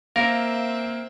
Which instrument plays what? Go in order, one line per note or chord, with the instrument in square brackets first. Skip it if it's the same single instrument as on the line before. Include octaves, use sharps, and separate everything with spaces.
[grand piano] A#3 [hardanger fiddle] C4 E5 [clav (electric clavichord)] A#4 [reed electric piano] F5